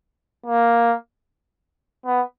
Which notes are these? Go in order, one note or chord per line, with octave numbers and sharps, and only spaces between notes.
A#3
B3